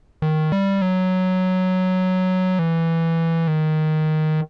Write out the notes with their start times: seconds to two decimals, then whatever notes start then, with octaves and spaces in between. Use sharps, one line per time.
0.22 D#3
0.52 G3
0.82 F#3
2.59 E3
3.48 D#3